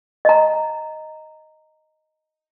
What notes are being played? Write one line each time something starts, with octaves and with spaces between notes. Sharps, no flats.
D#5 A#5